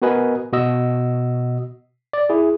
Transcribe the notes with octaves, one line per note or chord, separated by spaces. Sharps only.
B3 F#4 A#4 B4 D#5 G#5
B2 F#4 D#5 E6
D5
E4 G#4